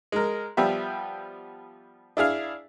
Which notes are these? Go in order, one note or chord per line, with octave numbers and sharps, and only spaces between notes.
G#3 A#4
F3 G3 B3 G4 E5
D4 E4 G#4 F5